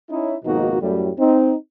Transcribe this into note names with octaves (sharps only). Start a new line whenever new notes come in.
C#4 D#4 E4
G#1 F2 B2 A#3 D#4 F#4
F#2 A2 G3
C4 D#4